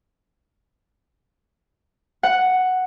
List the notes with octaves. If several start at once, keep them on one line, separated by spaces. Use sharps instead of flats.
F#5